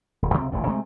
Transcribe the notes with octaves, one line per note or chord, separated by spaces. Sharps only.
D#1
C#2 C3 C4
D#1 A1 D2 A2
C3 G#3 A3 C4